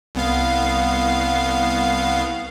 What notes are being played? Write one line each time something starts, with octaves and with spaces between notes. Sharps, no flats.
C2 B3 F5